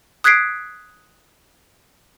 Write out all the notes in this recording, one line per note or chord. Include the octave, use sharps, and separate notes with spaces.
D#6 F#6 G#6 B6 C7 D7